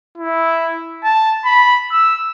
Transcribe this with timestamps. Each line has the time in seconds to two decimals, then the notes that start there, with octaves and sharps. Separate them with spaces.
0.18 E4
1.04 A5
1.45 B5
1.92 E6